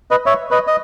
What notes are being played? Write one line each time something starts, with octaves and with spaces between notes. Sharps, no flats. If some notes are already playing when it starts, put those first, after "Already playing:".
B4 D#5
C#5 E5
B4 D#5
D#5